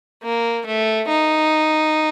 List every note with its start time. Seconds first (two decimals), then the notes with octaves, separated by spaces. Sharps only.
0.23 A#3
0.66 A3
1.08 D#4